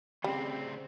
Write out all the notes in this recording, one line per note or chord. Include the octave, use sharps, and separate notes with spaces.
D2 C#3 G3 C4